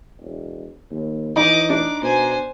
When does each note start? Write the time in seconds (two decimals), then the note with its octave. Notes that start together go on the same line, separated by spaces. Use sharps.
0.20 E1
0.91 D#2
1.36 E3 D#4 D#5 D6
1.70 D4 D6
2.02 B2 C5 G#5